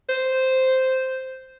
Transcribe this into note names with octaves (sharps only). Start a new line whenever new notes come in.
C5